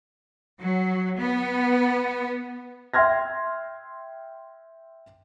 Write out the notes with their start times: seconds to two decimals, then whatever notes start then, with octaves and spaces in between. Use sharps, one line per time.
0.60 F#3
1.18 B3
2.94 E5 G5 C6 F6 G#6 A#6